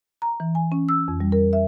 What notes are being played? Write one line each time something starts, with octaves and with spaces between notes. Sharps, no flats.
A#5
E3
G#5
C#4
E6
F2
G3
A#4
E5